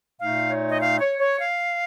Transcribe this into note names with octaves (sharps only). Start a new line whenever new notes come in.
A#2 A3 D#4 F5
C#5
D#5
F5
C#5
C#5
F5